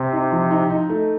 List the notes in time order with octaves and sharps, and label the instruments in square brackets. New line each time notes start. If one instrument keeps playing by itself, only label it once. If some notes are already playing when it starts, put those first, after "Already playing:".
Already playing: [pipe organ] C3 [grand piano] C4
[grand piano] D#4
F3
D#4
D#4
A3